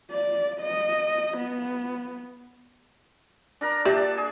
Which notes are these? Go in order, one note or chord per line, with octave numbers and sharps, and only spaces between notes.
D5
D#5
B3
D4 A#4 A#5
A#2 D4 G4 D5 E5 A5
G#4